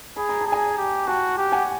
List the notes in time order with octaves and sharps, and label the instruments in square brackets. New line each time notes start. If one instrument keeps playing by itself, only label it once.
[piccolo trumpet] G#4 [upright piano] B5
[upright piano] A#5
A5
[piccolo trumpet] G#4
[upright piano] G#5 A#5
[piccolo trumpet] G4
[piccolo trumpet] F#4 [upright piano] G5 A5
[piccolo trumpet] G4
[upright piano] F#5 G#5